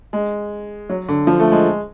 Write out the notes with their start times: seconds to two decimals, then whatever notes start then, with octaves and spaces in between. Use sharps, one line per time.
0.13 G#3
0.90 F#3
1.09 D3
1.27 F3
1.40 A3
1.52 G#3